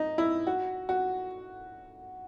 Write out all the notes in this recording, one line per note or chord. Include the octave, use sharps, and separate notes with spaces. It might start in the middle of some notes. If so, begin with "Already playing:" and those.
Already playing: D#4
E4
F#4
F#4